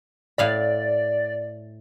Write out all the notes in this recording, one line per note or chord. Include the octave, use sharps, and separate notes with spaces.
A2 D5 F5 B5